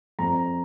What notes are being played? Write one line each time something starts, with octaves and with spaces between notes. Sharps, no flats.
F2 A#5